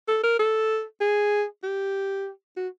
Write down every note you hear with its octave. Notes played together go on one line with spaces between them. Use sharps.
A4
A#4
A4
G#4
G4
F#4